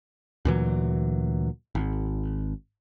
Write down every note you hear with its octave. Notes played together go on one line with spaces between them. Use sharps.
D2 A#2 E3 F#3
G#1